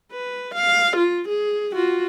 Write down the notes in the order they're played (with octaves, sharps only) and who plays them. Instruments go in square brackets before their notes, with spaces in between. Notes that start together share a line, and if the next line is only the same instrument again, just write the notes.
[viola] B4
F5
F4
G#4
F4 F#4